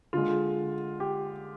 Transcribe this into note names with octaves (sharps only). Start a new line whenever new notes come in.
D3 G#3 F4
G4